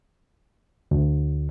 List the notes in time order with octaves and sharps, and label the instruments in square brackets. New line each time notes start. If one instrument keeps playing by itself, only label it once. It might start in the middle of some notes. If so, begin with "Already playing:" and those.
[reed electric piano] D2